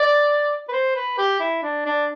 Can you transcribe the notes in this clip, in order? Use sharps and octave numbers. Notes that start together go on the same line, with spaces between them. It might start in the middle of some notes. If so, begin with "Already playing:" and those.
Already playing: D5
B4
C5
B4
G4
E4
D4
D4